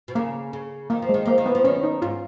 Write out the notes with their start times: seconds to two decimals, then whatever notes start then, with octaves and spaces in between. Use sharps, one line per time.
0.08 B2
0.15 C#3 A#3
0.53 C#3
0.90 D#3 A#3
1.02 F3
1.09 D#3 G#3
1.26 F3 A#3
1.38 D#3
1.46 B3
1.55 F3
1.64 D#3 C#4
1.83 D#4
2.02 G#2 F4